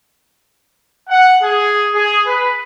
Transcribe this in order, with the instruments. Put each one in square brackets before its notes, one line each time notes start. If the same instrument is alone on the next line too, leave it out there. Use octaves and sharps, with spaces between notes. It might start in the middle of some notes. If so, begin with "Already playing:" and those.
[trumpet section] F#5
G#4
G#4
B4